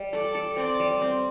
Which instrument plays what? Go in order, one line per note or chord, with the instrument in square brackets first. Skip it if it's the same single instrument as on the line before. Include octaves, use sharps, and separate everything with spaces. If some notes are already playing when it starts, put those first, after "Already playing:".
Already playing: [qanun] G3
[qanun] A4 [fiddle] D5
[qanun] A4
[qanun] C4 [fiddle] D5
[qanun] G3
C4